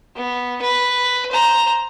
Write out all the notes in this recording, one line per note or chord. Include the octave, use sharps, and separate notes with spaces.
B3
B4
C5 A#5